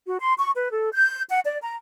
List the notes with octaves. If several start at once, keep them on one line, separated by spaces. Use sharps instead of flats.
F#4
C6
C#6
B4
A4
G6
F#5
D5
A#5